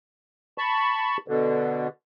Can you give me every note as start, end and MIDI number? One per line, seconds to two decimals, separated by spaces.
0.58 1.17 81
0.58 1.17 83
0.58 1.17 85
1.28 1.88 47
1.28 1.88 50